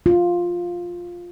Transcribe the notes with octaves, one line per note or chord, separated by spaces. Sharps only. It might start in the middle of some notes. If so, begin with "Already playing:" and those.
F4